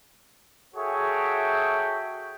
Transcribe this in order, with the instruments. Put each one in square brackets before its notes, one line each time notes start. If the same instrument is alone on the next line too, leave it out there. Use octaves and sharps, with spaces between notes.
[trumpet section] F#4 G#4 A4 C#5 E5 G5